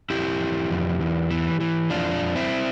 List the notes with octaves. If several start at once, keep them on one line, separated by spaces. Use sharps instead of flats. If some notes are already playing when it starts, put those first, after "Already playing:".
F2 E4 G4
E3
F2
E2
E3
E3
F2 D4 F4
F2
C4 E4